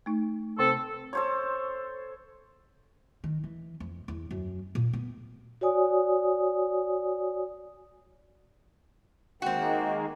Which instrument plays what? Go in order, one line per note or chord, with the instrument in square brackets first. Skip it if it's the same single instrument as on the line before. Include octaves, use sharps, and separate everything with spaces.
[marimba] A3 D#4
[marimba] C3 [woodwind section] C4 A4
[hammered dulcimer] A4 C5 C#5
[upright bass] D#3
E3
F2
E2
F#2
A#2
B3
[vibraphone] F#4 C#5 D5 G#5 D#6
[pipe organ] D#3 G#3 A#3 [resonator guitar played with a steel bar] C4 F#4 [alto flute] G5